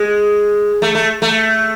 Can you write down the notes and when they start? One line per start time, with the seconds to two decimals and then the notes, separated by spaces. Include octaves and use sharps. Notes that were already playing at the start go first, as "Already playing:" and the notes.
Already playing: G#3
0.82 A3
0.95 A3
1.22 A3